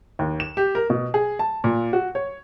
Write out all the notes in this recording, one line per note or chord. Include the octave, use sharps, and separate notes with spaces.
D#2
E7
G4
A#4
B2
G#4
A5
A#2
F#4
C#5